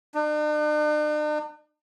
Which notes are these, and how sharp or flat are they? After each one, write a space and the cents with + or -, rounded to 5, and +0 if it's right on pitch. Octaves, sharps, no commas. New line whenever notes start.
D4 +45